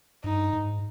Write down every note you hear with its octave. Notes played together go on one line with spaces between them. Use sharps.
G2 D#4
G#2